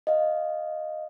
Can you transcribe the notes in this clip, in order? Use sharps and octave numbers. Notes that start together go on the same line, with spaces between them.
D#5 F5